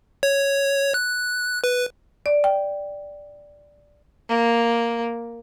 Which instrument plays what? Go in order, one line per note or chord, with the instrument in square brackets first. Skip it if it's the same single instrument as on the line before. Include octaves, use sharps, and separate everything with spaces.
[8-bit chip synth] C#5
F#6
B4
[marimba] D5
G5
[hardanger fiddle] A#3